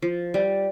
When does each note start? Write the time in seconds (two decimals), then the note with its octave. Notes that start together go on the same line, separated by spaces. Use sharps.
0.02 F3
0.34 G3